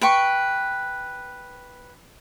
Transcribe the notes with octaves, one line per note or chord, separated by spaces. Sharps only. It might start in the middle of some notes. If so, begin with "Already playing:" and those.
B4 G5 C#6